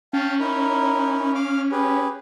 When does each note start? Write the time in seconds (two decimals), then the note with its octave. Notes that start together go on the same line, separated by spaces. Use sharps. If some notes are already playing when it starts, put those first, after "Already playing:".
0.13 C#4 F5 G5 A5
0.39 D#4 E4 A#4
1.35 F5 D6 F6
1.72 G4 G#4 B4